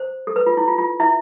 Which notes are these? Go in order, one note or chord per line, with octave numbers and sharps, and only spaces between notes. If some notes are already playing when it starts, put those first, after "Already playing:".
Already playing: C5
A4
B4
F4
E4
F4
F4
E4 E5